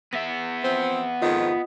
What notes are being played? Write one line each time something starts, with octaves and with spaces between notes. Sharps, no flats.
B3 E5 A#6
F3 C4
F2 G#2 D#3 F4 D#5